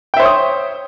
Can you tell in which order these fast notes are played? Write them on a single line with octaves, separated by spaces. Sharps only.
G5 E5 C5 C#5 D#6